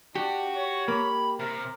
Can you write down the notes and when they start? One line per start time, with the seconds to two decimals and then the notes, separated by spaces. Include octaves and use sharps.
0.16 D4 F#4 G4
0.56 C#5
0.88 A#3 B5
1.39 C3 A#4